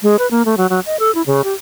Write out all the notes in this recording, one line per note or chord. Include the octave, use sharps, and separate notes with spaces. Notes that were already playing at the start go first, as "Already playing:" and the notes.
G#3
B4
A#3
A3
F#3
F#3
D#5
A4
E4
C#3
G4